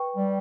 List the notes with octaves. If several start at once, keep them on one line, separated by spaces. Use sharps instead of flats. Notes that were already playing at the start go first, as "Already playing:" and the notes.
Already playing: B4 G5 C#6
G3